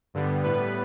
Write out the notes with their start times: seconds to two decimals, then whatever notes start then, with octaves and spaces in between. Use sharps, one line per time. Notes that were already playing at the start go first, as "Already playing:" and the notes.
0.14 G2 D3 G3 B3
0.43 A2 G3 B3 B4